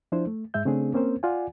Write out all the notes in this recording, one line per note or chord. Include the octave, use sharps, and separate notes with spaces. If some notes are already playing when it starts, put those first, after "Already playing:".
F3 D4 E4 C5
A3
G#2 G#3 E5 G6
C#3 A3 C4 D4 G#4
A#3 C4 C#4 A#4 C5
F4 D5 F#5 G#5